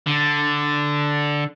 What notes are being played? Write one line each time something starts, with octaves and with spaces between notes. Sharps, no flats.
D3